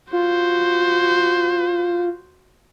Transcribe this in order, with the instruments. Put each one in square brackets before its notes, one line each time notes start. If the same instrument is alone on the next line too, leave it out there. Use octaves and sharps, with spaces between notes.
[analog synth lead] F4 [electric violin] F#4 C5